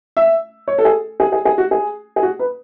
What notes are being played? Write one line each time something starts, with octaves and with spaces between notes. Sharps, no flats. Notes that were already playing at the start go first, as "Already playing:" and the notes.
E5
C#5
A4
G#4
G#4
G#4
G#4
F#4
G#4
G#4
F#4
B4